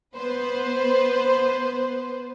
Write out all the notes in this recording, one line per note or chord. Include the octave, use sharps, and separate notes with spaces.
B3 B4 C5